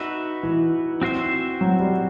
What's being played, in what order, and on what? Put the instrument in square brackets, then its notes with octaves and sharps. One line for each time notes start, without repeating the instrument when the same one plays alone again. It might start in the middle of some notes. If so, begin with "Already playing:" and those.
Already playing: [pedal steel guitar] D#4 F#4 B4 E5
[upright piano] E3
[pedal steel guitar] C4 F#4 C5 E5
[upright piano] F#3
G3